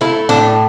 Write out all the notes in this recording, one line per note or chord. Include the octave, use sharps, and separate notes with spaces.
A3 E4
A2 D4